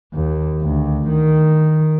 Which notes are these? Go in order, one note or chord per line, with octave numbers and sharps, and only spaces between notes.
D#2
D2
D#3